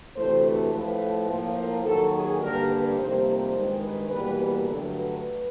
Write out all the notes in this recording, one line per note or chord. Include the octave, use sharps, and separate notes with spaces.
D2 C3 E3 A3 C5
B4
A2 F3 A3 B4
A2 F3 A#3
A#4
D#2 D#3 F#3 A4
G#4
G2 D3 G3 A#3 A#4
B4
F2 C3 D#3 G3 A#3 C5
C5
G2 D#3 G#3
B4
E2 B2 G3 A#3 B4
B4
G2 D3 F#3 A3 A4
B4